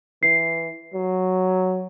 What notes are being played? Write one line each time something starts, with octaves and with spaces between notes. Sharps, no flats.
E3 C7
F#3